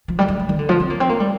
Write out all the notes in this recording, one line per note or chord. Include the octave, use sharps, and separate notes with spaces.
F3
G3
A3
A3
D#3
D3
F3
C4
A#3
C4
A#3
G3